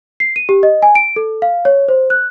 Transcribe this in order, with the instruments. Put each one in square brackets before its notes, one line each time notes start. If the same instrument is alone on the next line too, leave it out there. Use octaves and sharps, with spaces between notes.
[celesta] C7
D#7
G4
D#5
G#5
D7
A4
F5
C#5
C5
F#6